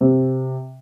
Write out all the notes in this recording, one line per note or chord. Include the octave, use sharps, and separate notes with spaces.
C3 C4